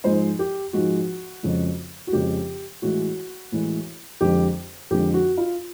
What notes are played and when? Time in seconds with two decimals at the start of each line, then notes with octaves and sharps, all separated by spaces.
0.04 G#2 F3 G#3 C5
0.39 G4
0.73 G#2 F3 G#3 F#4
1.43 F2 C#3 F3 G#3
2.07 F#4
2.12 F2 C#3 F3 G#3 G4
2.82 A2 E3 G#3 F#4
3.52 A2 E3 G#3
4.21 F2 D3 F3 G#3 G4
4.91 F2 D3 F3 G#3 G4
5.14 F#4
5.37 F4